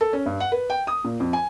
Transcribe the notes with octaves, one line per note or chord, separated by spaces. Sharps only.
A4
C#4
G2
F#5
B4
G5
D#6
A#2
F2
G#5